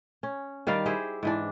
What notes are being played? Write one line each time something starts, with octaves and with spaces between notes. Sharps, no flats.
C#4
D#3 G3 D5 F5
E4 G4 G#4 C5
G#2 E3 D4